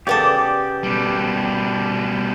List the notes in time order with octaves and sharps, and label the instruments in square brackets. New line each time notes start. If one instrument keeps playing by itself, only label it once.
[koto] C#3 B3 A4 [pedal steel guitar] G4 D5
[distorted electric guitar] B2 G3